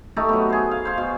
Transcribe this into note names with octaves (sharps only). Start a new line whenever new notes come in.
A3 D#4 G4 A4
F#3 B3
G#4 C5
F5
C5 F5
B2